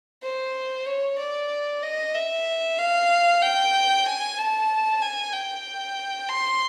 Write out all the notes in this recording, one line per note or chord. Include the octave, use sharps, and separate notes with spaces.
C5
C#5
D5
D#5
E5
F5
G5
G#5
A5
G#5
G5
C6